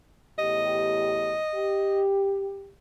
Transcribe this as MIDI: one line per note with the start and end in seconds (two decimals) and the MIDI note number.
0.38 1.40 40
0.38 1.40 45
0.38 1.40 67
0.38 2.01 75
1.54 2.68 67